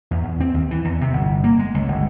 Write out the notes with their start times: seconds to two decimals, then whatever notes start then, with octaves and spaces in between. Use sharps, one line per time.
0.11 E2
0.23 E2
0.40 C4
0.54 D#2
0.71 E3
0.85 E2
1.01 C3
1.13 G1
1.44 A#3
1.59 G#3
1.74 C#2
1.88 G1